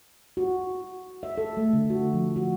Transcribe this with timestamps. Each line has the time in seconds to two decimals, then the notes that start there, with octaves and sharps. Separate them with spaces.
0.37 F#4
1.23 E5
1.38 A4
1.57 A3
1.73 D3
1.90 F#4
2.13 F3
2.36 F#4